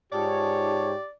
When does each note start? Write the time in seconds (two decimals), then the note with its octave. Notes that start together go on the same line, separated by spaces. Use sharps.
0.12 G#2 D#4 F4 G4 C#5 D5 A5